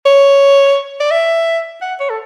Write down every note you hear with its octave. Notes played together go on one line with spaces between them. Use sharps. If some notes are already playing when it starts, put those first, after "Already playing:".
C#5
D5
E5
F#5
C#5
A4